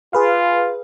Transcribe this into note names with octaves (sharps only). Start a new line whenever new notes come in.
F4 G#4 B4 F5